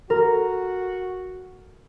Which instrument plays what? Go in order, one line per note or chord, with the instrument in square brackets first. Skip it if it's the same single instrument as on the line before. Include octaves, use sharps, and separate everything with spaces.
[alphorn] F#4 [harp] A#4